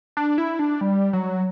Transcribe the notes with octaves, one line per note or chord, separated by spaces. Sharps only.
D4
E4
D4
G3
F#3